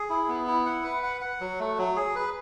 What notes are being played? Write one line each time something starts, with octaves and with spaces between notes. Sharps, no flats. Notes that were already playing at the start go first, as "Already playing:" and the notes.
Already playing: G#4
E4
B3
E4
F#5
B4
F#5
F#5
F#3
A3
F#3
G#4
B4